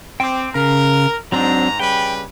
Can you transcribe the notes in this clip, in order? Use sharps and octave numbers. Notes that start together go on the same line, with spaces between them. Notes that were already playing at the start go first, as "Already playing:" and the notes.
C4 G5 D6
C#3 A#4
G#2 F#3 C4 D4 A#5
C#3 G3 B4 G5